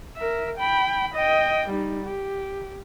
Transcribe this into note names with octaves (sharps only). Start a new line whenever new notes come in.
A#4 E5
G5 B5
D#5 G5
G3 D#4
G4